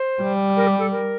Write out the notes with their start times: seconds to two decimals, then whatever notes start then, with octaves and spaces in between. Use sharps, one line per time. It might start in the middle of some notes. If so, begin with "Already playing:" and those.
Already playing: C5
0.21 G3
0.56 A#4
0.66 G4
0.78 A4
0.90 A#4